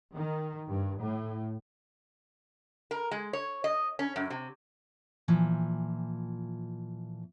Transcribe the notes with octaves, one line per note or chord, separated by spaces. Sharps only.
D#3
G2
A2
A#4
G#3
C#5
D#5
C#4
F#2
C3
A#2 E3 F3